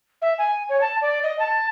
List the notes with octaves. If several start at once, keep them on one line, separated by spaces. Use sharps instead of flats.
E5
G#5
C#5
A5
D5
D#5
A5